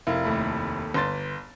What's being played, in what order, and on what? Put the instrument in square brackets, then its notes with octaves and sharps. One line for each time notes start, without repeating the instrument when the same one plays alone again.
[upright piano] F1 E4 [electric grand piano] A#4 F5
[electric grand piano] D#2 A3 B5
[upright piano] G1 C6 A6 [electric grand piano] B4